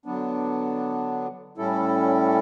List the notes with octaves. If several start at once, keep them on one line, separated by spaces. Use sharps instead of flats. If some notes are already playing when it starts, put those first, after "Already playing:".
D3 F#3 B3 D4
A2 G3 C#4 E4 A4